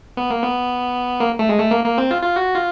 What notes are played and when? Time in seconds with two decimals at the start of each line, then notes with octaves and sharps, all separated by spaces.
0.17 B3
0.31 A#3
0.43 B3
1.20 A#3
1.39 A3
1.49 G#3
1.58 A3
1.71 A#3
1.85 A#3
1.98 C4
2.11 F4
2.23 F4
2.36 F#4
2.55 F4